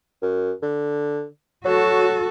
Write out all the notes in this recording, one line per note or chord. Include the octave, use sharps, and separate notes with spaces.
F#2
D3
F#3 F#4 A4